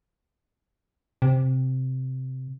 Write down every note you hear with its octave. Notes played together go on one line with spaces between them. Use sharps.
C3